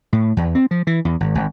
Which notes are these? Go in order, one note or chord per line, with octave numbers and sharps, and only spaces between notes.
A2
E2
C4
F3
E3
E2
G#1
G#1